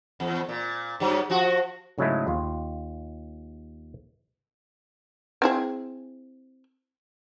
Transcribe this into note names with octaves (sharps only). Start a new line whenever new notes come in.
E2
A#2
G2 F#3
F3 F#4
G#2 C#3 F#3 G#3 A3 E4
D#2 F4
C4 E4 G#4